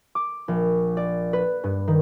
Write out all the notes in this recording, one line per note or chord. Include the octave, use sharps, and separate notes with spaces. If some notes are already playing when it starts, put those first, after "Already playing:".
D6
A#1
D5
B4
G2
D#3